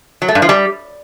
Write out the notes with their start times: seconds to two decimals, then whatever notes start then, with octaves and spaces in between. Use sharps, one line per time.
0.22 F#3
0.28 A3
0.35 G2
0.42 F3
0.49 G3